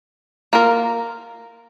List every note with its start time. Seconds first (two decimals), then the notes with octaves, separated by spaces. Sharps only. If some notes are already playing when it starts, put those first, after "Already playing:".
0.53 A#3 F4 A#4